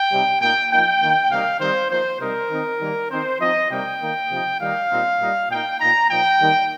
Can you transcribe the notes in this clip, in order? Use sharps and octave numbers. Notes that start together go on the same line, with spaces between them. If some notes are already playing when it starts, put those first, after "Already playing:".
Already playing: G5
C3 G3 C4 D#4
A#2 A#3 D#4 G5
F3 A#3 D#4 G5
D#3 A#3 D#4
C3 G3 A#3 D#4 F5
D#3 G3 C4 D#4 C5
F3 A#3 D#4 C5
C3 G3 C4 D#4 A#4
D#3 C4 D#4
D#3 G3 A#3
D#3 C4 D#4 C5
F3 C4 D#4 D#5
C3 G3 A#3 D#4 G5
D#3 A#3 D#4
C3 F3 D#4
D#3 G3 A#3 D#4 F5
A#2 G3 C4 D#4
A#2 G3 D#4
A#2 A#3 D#4 G5
A#2 A#3 D#4 A#5
A#2 F3 D#4 G5
D#3 G3 A#3 D#4